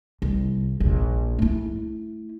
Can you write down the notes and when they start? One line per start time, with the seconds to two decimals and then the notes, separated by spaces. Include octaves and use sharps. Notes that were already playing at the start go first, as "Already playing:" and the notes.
0.22 C2
0.80 A#1 D#2
1.39 A3 E4